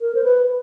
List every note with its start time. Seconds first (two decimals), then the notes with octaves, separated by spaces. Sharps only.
0.01 A#4
0.15 C5
0.24 B4